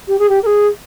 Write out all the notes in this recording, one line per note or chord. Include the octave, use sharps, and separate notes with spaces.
G4
G#4
G4
A#4
G#4